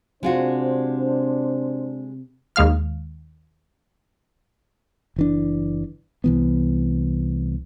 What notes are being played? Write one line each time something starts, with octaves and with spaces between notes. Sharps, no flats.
C3 G#3 D4 F4 F#4 C5
D#2 G#3 F5 F6
F#1 E3 D4
C2 E3 B3